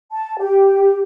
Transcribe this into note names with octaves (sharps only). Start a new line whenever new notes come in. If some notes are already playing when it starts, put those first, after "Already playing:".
A5
G4